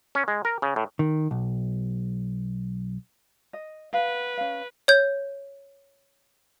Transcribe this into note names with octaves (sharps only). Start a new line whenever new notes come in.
C#4
G#3
A#4
C#3
A2
D#3
B1
D#5
B4 F5 F#5
C#4 F5
C#5 G6